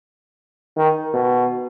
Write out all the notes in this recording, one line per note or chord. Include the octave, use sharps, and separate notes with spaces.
D#3
B2